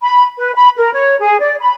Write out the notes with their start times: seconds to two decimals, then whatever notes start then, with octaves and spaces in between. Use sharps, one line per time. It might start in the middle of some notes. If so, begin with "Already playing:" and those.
0.01 B5
0.38 B4
0.55 B5
0.76 A#4
0.92 C#5
1.20 G#4
1.40 D5
1.59 B5